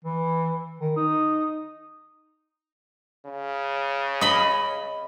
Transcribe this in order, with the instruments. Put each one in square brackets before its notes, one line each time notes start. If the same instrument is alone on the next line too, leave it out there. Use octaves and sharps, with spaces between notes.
[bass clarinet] E3
D#3
D#4
[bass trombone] C#3
[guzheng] D#5 B5